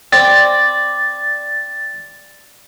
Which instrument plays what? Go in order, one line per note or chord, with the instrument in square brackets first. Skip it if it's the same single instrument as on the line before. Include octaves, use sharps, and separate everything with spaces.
[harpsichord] C4 [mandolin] D5 [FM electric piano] A6